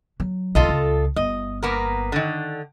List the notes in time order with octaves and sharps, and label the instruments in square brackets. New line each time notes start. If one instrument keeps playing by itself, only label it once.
[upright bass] F#3
[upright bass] B1 E2 [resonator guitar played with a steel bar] F4 A4 D#5
[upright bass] C#2
[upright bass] G1 [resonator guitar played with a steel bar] D#5
[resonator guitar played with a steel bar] A#3 B3 A#4
D3 D#3